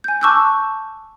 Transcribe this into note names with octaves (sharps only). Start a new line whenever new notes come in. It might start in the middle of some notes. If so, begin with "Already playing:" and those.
G#5 G6
A5 C#6 D6 E6 F#6 G6